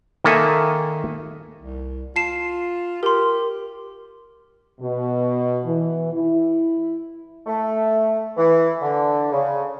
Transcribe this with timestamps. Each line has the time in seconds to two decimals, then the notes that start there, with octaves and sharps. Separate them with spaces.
0.24 D#3 A#3 A4 E5 G#5
1.61 C2
2.16 F4 A5 C7 E7
3.03 G4 A#4 C6
4.81 B2
5.65 E3
6.13 E4
7.47 A3
8.37 E3
8.82 D3
9.32 C#3